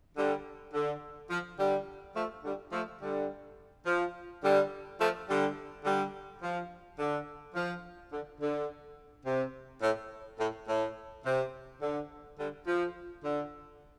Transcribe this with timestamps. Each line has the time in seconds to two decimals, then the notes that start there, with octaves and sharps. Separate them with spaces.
0.16 D3 G3
0.73 D3
1.30 F3
1.58 D3 G3
2.16 F3 A3
2.44 D3 G3
2.72 F3 A3
3.01 D3 G3
3.86 F3
4.43 D3 G3
4.99 F3 A3
5.28 D3 G3
5.84 D3 G3
6.42 F3
6.99 D3
7.55 F3
8.12 D3
8.41 D3
9.26 C3
9.82 A2
10.39 A2
10.68 A2
11.25 C3
11.81 D3
12.39 D3 G3
12.66 F3
13.24 D3